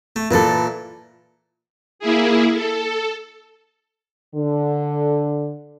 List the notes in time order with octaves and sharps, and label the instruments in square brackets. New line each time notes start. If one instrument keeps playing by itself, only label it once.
[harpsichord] A3
[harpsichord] A#2 E3 D5 [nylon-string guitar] A4 B4
[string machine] A#3 E4 G#4
A4
[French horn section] D3